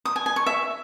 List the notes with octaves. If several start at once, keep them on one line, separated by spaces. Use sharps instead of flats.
D#6
G#5
G#5
C#6
E5